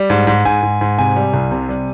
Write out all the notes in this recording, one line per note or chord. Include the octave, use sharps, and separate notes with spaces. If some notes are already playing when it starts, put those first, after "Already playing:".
Already playing: G3
G#2
G#2
G#2 G#5
G#2
G#2
C3 G#5
G3
C2
C3
G3